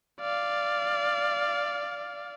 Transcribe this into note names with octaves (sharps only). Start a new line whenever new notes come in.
D5 F5